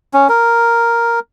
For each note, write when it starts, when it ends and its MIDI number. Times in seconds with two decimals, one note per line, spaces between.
0.13 0.28 61
0.29 1.19 70